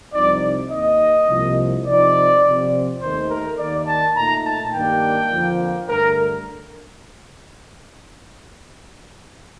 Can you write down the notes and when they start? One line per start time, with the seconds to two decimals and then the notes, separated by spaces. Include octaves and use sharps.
0.13 C2 C3 F3 C4 D#4 D5
0.71 D#2 D#3 A#3 D#5
1.28 C2 C3 F3 A#3
1.86 C3 F3 C4 D#4 D5
2.44 C3 F3 C4
3.01 D#2 D#3 A3 C5
3.30 A#4
3.58 D#2 D#3 A#3 D5
3.87 A5
4.16 A#2 A3 D#4 A#5
4.45 A5
4.74 G2 D#3 G3 A#3 D4 G5
5.32 F2 D3 F3 A#3
5.89 G2 D3 A3 A#4